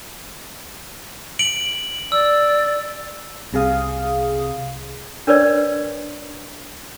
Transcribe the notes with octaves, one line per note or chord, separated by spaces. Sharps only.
D7 F#7
D5 E6
C2 C3 G#4 F5 D#6
D4 A#4 B4 C#5 D5